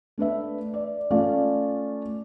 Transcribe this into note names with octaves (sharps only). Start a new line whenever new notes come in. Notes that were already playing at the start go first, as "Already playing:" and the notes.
A3 D4 B4 E5
D5
A3 C#4 F4 D5 F5